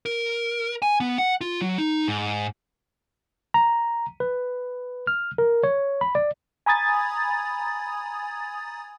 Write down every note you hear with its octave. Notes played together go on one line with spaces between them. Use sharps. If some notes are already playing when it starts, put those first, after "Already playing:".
A#4
G#5
B3
F#5
F4
F#3
D#4
G#2
A#5
B4
F6
A#4
C#5
B5
D5
G#5 A#5 B5 D#6 G#6 A6